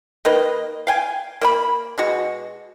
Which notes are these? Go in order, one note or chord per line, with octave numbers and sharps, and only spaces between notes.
D#3 A#3 B4 D#5
F5 G5 G#5
A#3 D#5 B5
B2 G#3 F#4